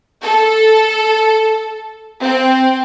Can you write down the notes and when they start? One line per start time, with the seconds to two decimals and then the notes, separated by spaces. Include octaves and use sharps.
0.22 A4
2.20 C4